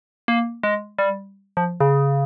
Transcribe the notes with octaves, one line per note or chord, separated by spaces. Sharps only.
A#3
G#3
G3
F3
C#3